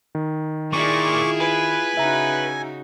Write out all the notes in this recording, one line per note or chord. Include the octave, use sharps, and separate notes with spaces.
D#3
A#2 E4 F4 G#4 C#6 D6
B4 G#5
C#3 D#4 F#4 E5 A#5